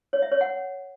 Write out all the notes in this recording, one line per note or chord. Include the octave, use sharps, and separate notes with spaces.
C#5
E5
C#5
F#5